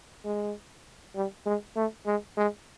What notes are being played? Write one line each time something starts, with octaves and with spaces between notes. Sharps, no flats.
G#3
G3
G#3
A3
G#3
G#3